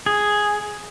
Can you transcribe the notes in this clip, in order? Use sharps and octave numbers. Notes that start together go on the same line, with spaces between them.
G#4